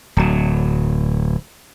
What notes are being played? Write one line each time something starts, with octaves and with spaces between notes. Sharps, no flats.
D1 F#3